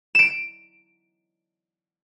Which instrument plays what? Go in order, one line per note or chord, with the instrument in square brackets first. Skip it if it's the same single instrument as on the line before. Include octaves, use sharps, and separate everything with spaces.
[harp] D7 E7